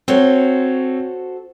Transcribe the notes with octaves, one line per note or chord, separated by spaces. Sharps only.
C4 F#4 A4 C5 C#5